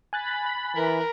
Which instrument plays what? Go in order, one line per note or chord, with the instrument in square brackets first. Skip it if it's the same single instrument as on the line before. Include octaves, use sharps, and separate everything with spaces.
[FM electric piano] G#5 F#6 A6 [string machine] B5
[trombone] E3 [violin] A#4